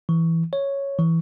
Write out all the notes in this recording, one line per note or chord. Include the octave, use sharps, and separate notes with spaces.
E3
C#5
E3